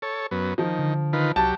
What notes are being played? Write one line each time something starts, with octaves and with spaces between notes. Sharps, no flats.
A4 C#5
F#2 B3
D#3 F3
D3
D#3 F4 B4
C2 F#3 G4 A5